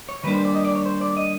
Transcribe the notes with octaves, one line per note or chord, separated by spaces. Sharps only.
C#5
D#3 G3 A#3 D4 B4
C5
D5
D#5
D5
C#5
C5
D5
D#5